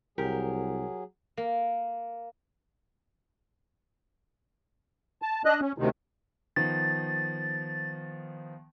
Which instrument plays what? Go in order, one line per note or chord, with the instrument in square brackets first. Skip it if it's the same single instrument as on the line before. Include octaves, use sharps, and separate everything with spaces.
[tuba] C2 [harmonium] F#3 G#4 [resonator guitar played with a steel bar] G4 A#4
[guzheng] A#3
[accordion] A5
D4 D#5 F#6
C#4
D2 C3 D#3
[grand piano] D#3 F3 B3 [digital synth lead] A6